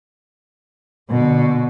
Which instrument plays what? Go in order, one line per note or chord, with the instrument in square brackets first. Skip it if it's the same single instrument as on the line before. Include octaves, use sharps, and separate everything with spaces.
[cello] B2 D3